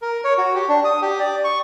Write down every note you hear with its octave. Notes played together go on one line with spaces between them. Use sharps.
A#4
C#5
F#4
G4
D4
D#6
G4
D5
C#6